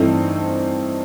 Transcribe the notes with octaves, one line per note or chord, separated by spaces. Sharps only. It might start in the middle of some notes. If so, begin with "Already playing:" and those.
Already playing: G2 E3 A3 C4 D#4